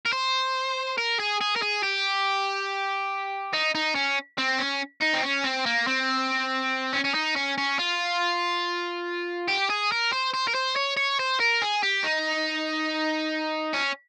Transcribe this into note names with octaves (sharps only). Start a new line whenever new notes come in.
A#4
C5
A#4
G#4
G#4
A#4
G#4
G4
D#4
D#4
C#4
C4
C#4
D#4
C4
C#4
C4
A#3
C4
C#4
C#4
D#4
C#4
C#4
F4
G4
G#4
A#4
C5
C5
A#4
C5
C#5
C#5
C5
A#4
G#4
G4
D#4
C#4